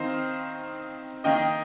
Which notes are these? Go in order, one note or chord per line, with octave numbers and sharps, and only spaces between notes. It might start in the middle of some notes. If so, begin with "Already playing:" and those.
Already playing: D#3 C4 D#4 C5 F5
D#3 A#3 D#4 D#5 G5